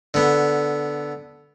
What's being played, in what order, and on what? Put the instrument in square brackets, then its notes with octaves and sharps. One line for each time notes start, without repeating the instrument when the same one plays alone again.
[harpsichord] D3 B3